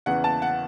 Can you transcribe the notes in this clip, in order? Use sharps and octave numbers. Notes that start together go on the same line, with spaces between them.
E2 C#3 E3 F#5
A5
F#5